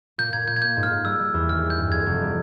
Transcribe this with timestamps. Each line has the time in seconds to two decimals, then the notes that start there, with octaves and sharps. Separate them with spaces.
0.18 A#2 G6
0.33 A#2 G#6
0.47 A#2 G6
0.56 G#6
0.62 A#3 G6
0.77 G#2
0.83 F6
0.91 G#2
1.05 G3 E6
1.20 G3
1.34 E2
1.48 G#1 F6
1.63 G3
1.70 G6
1.78 G2
1.92 F2 G#6
2.06 F1
2.21 G3